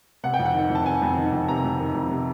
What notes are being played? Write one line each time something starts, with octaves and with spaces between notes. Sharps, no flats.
C3 F#5
G5
F2
F#5
D#3
F2
A5
C3 G#5
F2
D#3
F2
C3 A#5
F2
D#3
F2
C3